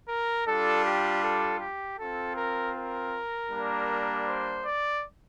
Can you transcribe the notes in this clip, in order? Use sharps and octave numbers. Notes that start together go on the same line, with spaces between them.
A#4
G3 D4 F4 A4
G4
A4
G4
C4 F4 A4
A#4
A#4
G3 A#3 D4
C5
D5